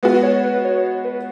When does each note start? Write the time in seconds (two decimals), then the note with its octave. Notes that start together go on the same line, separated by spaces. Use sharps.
0.03 G#3 B3 F#4 B4
0.23 C#5
0.44 B4
0.65 C#5
1.04 B4